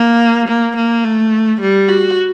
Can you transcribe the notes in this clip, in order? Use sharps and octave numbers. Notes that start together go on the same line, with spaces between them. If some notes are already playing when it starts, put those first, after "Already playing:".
Already playing: A#3
A#3
A#3
A3
G3
F#4